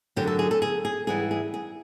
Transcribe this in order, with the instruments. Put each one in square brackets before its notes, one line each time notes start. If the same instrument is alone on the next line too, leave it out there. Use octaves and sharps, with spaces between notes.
[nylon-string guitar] F#2 D3 F#3 G4
A4
G#4
A4
G#4
G#4
G#2 E3 G3 G#4
G#4
G#4